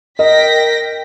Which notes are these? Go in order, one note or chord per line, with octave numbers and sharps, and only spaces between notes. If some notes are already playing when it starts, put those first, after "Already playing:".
A#4 D#5 G5 A#6 B6